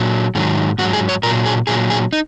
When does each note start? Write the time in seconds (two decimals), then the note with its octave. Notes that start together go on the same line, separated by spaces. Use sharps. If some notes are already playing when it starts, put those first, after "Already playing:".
Already playing: A#2 F#3
0.35 G#2 D#3 F#3
0.78 G#2 F#4
0.82 F#3
0.93 G#4
1.09 C#5
1.23 A#2 A#4
1.26 F#3
1.46 G#4
1.67 A#2 F#3 G#4
1.90 G#4
2.13 D#4